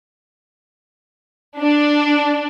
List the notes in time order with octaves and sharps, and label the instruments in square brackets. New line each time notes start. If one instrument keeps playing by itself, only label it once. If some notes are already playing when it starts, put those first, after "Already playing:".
[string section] D4